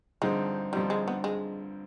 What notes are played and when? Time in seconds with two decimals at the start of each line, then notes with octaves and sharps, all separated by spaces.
0.22 G2 D3 F3 G#3 C4 D#4
0.73 G2 D3 F3 G3 C4 D#4
0.90 G#3
1.08 B3
1.24 G#3